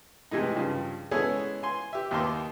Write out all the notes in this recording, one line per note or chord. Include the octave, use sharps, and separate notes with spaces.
A2 C3 E3 G#3 D#4
G2 C#3 F3
G#3 B3 C#4 E4 G#4 A4
G#5 C6
G4 E5
D#2 D#3 A#3 A5 C6 D6